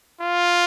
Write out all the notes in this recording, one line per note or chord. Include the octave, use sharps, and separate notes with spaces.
F4